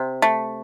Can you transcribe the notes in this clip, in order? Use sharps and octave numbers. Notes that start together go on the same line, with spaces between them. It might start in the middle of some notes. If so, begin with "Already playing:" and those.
Already playing: C3
A3